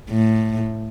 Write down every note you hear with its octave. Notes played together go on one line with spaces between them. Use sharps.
A2